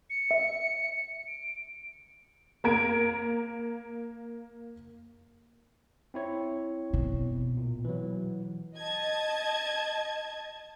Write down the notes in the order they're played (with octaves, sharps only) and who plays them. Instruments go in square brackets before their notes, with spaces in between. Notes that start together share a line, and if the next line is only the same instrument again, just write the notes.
[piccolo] C#7
[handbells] E5
[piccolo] D7
[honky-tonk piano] A#3 A#5 G#6 D7
[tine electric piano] C4 E4 C#5
[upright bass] B2
[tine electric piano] A#2
E3 F#3
[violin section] D#5 A5 G#6